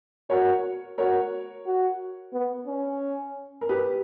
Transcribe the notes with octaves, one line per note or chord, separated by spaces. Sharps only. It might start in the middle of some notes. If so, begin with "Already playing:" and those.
F#4 A#4 C#5
F#4 A#4 C#5
F#4
B3
C#4
A#4
G4 B4